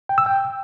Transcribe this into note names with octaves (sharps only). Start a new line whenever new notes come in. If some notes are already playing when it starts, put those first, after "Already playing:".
G5
E6
G5